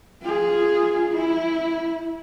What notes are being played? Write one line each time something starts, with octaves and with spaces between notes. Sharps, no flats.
F4 G#4
E4